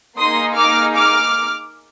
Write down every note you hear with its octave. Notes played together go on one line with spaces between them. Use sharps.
A#3 D#4 G#4 C6 D#6
D6 F6
D6 F6